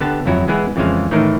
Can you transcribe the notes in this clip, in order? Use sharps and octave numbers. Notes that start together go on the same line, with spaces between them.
D3 B3 G4 A5
G1 F2 F#3 E4 F#4 A#5
E3 G#3 B3 E4 G#4
F2 C#3 E3 G#3 C5 F5
A2 D#3 E3 A3 D#4 A#4